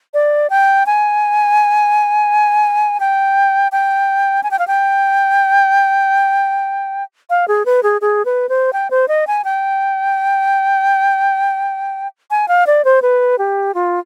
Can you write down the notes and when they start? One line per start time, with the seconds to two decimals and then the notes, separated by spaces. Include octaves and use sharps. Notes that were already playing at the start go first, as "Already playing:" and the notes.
0.14 D5
0.50 G5
0.86 G#5
3.00 G5
3.72 G5
4.43 G#5
4.51 G5
4.59 F5
4.68 G5
7.30 F5
7.48 G#4
7.66 B4
7.83 G#4
8.01 G#4
8.25 B4
8.49 C5
8.73 G5
8.91 C5
9.08 D#5
9.27 G#5
9.44 G5
12.31 G#5
12.48 F5
12.67 D5
12.85 C5
13.02 B4
13.39 G4
13.74 F4